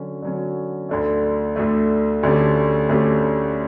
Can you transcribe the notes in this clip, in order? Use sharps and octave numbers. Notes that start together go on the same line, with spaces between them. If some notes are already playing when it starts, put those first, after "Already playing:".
Already playing: D3 F#3 C#4
D3 F#3 C#4
D2 D3 A3
D2 D3 A3
D2 D3 A3 C#4 G4
D2 D3 A3 C#4 G4